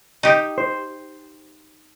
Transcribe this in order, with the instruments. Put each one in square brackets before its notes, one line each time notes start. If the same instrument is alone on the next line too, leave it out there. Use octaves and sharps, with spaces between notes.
[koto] D#4 G4
[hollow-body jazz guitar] C5